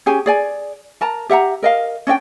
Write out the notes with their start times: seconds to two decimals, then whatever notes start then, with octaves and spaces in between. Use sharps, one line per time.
0.06 C#4 G4 G#4 G#5
0.26 G#4 D5 G#5
1.01 A#4 A5 A#5
1.30 G4 E5 F#5 A#5
1.63 A#4 D#5 F5
2.07 C#4 D4 D#5 G5